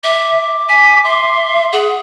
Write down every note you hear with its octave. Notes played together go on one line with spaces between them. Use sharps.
E5 D6
G#5 B6
E5 C6
G#4 F#5